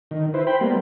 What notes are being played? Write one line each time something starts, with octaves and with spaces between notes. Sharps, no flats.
D#3
E4 B4 C5
C5 G5 B5
G3 A#3 B3